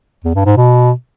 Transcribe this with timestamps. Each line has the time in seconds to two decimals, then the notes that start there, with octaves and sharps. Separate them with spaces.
0.24 E2
0.35 G2
0.46 G#2
0.57 B2